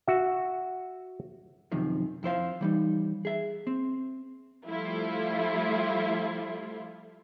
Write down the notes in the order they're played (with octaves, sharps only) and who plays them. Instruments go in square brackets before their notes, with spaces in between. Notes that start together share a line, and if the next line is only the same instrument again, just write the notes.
[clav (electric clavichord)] F#4 E5
[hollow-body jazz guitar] F#2 C3 D#3 F3
F2 E4 C5 F5
E3 G3 D#4
G#4 E5
C4
[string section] F3 G3 A3 E4 F4